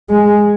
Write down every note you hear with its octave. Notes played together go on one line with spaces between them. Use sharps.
G#3